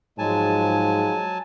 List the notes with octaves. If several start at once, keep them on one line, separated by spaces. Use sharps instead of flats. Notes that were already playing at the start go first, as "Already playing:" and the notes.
G#2 F3 F#3 G#3 G#5 A5